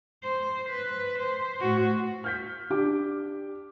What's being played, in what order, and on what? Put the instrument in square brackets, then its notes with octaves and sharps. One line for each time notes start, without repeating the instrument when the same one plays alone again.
[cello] C5
B4
C5
A2 F#4
[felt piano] F6 G6 B6
D4 G4 D6